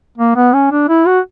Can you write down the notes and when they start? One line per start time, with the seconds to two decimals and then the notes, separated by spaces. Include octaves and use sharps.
0.18 A#3
0.36 B3
0.53 C#4
0.72 D4
0.89 E4
1.07 F#4